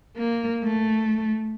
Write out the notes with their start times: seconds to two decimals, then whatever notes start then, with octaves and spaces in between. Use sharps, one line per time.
0.18 A#3
0.63 A3